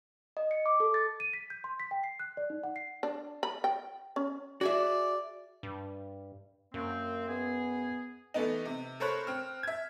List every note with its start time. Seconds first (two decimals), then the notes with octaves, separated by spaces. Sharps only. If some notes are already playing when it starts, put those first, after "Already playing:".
0.37 D#5
0.51 C#7
0.66 D6
0.80 A4
0.94 A6
1.20 D#7
1.33 B6
1.50 G6
1.64 C6
1.80 B6
1.91 G5
2.04 C7
2.20 F#6
2.37 D5
2.50 D#4
2.64 F#5
2.76 C7
3.03 D4
3.43 B5
3.64 G5
4.16 C#4
4.61 F#4 G#4 D5 E5
5.63 G2
6.74 F#2 A#3 C4
7.29 B3 G#4
8.34 E3 A3 B3 D#4
8.65 C3
9.00 A4 A#4 C5 C#5 B5 F#6
9.27 C4 F6
9.63 E5 G#6